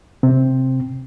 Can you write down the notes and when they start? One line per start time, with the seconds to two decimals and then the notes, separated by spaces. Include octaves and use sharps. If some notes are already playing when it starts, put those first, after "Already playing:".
0.23 C3 C4